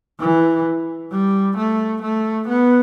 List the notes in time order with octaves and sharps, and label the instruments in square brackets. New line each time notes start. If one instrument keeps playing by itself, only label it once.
[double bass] E3
G3
A3
A3
B3